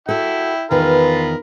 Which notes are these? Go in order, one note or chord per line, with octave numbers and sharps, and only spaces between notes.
E4 F#4 A4 G5
E2 D#3 F4 A#4 B4 B5